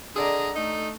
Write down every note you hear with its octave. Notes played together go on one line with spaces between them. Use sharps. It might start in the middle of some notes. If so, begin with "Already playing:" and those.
D3 G#4 A4 D5 D#5 A#5
A3 D#4